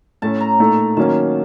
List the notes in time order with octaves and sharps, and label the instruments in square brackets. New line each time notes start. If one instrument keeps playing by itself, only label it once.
[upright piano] A2 A3 C#4 [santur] A5
[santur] A#5
[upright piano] A#2 A3 D#4 A4
[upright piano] D#3 F#3 A#3 C#4 [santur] A5